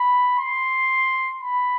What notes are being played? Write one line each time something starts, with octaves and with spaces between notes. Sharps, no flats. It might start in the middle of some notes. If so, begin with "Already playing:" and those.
Already playing: B5
C6
B5